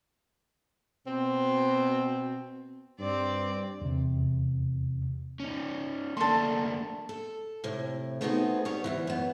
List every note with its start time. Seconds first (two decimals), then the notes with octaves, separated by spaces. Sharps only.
1.07 B2 C4
2.99 G2 C4 D5
3.81 E2 C3
5.40 C#4 D#4
6.17 A3 A#3 D4 A4 C6
7.09 A4
7.64 A2 C3
8.21 A3 B3 C4 D#4 F#4 G#4
8.65 G3 B3 C#5
8.84 D2 A#2 E3
9.07 F#2 B3